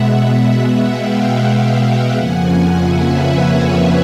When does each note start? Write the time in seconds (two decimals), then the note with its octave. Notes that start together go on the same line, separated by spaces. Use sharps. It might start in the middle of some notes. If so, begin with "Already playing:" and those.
Already playing: B2 G#3 B3 E5 F#5
0.85 F5 G5
2.13 F2 C#3 F3 A#3 F#5 G#5
2.78 E5 F#5
3.09 B4 C#5
3.41 B4 C#5